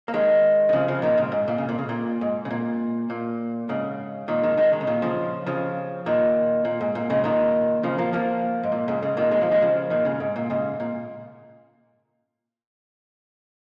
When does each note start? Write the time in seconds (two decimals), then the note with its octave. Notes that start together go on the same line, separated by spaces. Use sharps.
0.08 A#3
0.14 D#3 G#3
0.69 D#3
0.73 C#3 F3
0.88 C#3 F3
1.02 A#2 D#3
1.18 G#2 C#3
1.32 G#2
1.48 A#2
1.58 C#3
1.69 A#2
1.79 C#3
1.89 A#2
2.21 G#2
2.45 C#3
2.51 A#2
3.10 A#2
3.69 G#2 C#3
4.28 A#2 D#3
4.43 D#3 G#3
4.57 D#3 G#3
4.72 D#3 G#3
4.81 C#3
4.87 A#2 D#3
5.02 C#3 F3
5.46 C#3 F3
6.06 A#2 D#3
6.65 A#2
6.81 G#2
6.95 A#2
7.10 G#2 C#3
7.24 A#2 D#3
7.83 C#3 F3
7.98 F3 A#3
8.13 F3 A#3
8.63 G#2
8.72 A#2
8.88 G#2 C#3
9.02 G#2 C#3
9.17 A#2 D#3
9.31 D#3 G#3
9.41 F3 A#3
9.51 D#3 G#3
9.62 C#3 F3
9.90 A#2 D#3
10.05 G#2 C#3
10.20 G#2
10.36 A#2
10.50 G#2 C#3
10.80 A#2